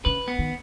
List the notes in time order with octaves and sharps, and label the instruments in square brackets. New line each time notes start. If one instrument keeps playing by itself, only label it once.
[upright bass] C#3 [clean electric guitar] B4
[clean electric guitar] B3
[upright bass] D#3